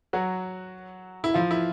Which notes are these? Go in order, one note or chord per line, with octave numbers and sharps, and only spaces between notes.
F#3 F#4
E4
F3 F4
E4